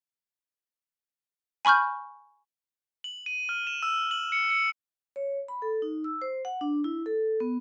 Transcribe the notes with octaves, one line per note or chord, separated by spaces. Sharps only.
G#5 B5 C#6 F6 G6
F#7
D#7
F6
E7
E6
F#7
C#7
C#7
C#5
B5
A4
D#4
E6
C5
F#5
D4
E4
A4
B3